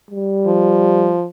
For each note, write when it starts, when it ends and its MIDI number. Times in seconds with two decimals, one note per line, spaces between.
0.11 1.14 55
0.46 1.25 53